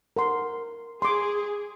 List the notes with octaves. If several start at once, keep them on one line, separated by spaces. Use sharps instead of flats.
A#4 F#5 C6
G#4 C6 D6